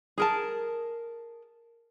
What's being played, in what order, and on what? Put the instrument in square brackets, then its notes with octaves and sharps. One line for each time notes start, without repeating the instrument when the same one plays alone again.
[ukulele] G#4 A#4 A5